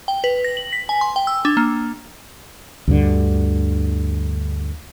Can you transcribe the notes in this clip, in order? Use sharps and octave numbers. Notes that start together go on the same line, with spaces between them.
G5
B4
A#6
F#7
B6
G#5
C6
G5
E6
D4
A#3
D2 G2 D3